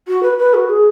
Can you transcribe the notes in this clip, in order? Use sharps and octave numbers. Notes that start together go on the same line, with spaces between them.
F#4
B4
B4
F#4
G#4